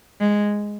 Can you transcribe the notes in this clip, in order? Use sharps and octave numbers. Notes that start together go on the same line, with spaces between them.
G#3